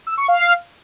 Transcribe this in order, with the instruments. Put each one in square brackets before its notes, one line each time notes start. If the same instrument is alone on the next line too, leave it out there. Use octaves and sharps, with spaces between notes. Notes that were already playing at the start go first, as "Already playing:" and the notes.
[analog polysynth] E6
C#6
F5